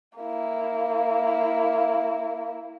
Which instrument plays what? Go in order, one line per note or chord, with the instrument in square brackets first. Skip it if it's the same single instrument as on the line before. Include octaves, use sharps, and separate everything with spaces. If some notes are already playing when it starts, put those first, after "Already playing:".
[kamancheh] A#3 E4